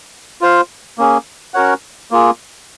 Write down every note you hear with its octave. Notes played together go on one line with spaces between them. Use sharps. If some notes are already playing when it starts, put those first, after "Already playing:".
F4 C5 F5
A#3 C#4 G#4
C#4 F#4 A#4 C#5 F#5
A#3 F4 G#4